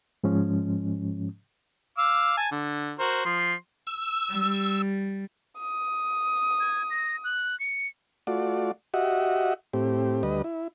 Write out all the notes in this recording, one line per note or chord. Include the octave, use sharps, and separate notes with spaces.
G#2 F3 G#3 C#4
F5 D6 E6
G#5 A5
D3
F#4 A#4 C5
F3 C6
E6
G3
D#6
G#6
A#6
F#6
C#7
A3 F4 F#4 D5
F#4 G4 D#5 E5 F#5
A2 C4 G4
D2 G3 B4 D#5
E4